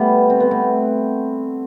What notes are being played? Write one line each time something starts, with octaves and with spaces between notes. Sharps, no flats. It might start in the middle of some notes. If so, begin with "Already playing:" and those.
Already playing: G3 A3 B3
C4
B3
A3 C4